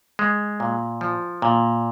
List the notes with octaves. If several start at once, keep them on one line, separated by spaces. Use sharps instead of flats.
G#3
A#2
F3
A#2